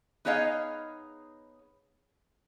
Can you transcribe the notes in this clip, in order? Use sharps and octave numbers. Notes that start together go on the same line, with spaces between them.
B3 D#4 G#4 C#5 D#5 F5